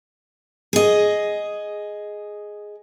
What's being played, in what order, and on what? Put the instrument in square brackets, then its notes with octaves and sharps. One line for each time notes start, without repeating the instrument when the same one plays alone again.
[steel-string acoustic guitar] G#4 D#5